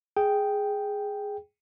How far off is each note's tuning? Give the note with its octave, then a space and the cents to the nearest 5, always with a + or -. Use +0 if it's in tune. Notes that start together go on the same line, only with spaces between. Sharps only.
G#4 +0 G5 +0